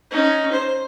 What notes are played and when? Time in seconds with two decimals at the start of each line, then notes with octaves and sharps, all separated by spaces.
0.11 C#4 D#4
0.52 C5